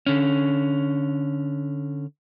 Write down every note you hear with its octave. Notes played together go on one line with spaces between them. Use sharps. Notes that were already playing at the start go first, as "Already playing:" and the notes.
D3 C#4